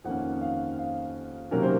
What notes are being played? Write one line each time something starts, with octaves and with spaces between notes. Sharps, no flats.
F2 D#3 A#3 C#4 F#5
F5
F5
C3 D#3 F#3 A#3 C#4 A#4
C5